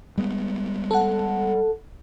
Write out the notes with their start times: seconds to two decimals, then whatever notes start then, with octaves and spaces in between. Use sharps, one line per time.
0.18 G3 G#3 B3
0.91 A4 F#5